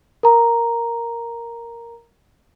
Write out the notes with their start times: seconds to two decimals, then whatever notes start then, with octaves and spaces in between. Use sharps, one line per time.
0.23 A#4 A#5